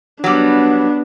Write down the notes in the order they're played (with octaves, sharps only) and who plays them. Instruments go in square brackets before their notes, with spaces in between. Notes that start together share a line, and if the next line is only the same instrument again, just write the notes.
[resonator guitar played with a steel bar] F#3 G3 [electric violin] B3 D4